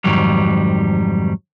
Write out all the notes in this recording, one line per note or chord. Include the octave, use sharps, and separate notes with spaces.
F2 G#2 D#3 F#3 G3